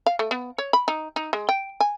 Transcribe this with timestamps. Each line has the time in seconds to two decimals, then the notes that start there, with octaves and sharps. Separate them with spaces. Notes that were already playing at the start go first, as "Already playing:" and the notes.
0.06 F5
0.19 A3
0.31 B3
0.58 C#5
0.73 B5
0.88 D#4
1.16 D#4
1.33 G#3
1.49 G5
1.80 G#5